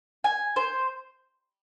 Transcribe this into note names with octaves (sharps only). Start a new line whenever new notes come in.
G#5
C5